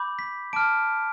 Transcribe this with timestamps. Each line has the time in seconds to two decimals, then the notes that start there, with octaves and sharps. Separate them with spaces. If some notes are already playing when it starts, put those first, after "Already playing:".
Already playing: B5 D6 G6
0.19 B6
0.53 A5 D6 F6 D7